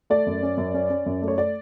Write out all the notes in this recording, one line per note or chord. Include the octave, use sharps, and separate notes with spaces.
A3 D5
F#2
C#4
F#2
C#4
C#4
F#2
A3
C#5
D5